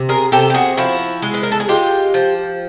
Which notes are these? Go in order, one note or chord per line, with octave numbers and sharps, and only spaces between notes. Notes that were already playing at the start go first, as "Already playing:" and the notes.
Already playing: C3
G#4 A#4
C3 G4 A4
G4
F#4 G#4
F3 E4 F#4
G#3
B4
A#4
A4
G#4
G#3 F4 G4
F3